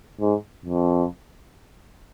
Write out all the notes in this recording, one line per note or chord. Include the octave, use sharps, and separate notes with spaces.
G#2
F2